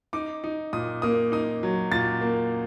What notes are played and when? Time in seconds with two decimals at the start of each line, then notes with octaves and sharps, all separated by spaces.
0.13 D#4 D6
0.44 D#4
0.73 A#2 D#6
1.02 A#3 D#6
1.32 D#4 D#6
1.63 F#3
1.92 A#2 A6
2.21 A#3